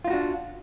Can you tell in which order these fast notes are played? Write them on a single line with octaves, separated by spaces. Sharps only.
F4 D#4 F#4 D4